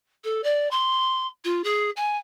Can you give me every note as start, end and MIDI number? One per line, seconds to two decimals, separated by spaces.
0.24 0.41 69
0.43 0.69 74
0.71 1.27 84
1.44 1.62 65
1.64 1.90 68
1.96 2.16 80